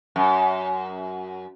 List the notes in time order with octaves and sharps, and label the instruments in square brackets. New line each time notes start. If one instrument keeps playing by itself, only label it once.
[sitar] F#2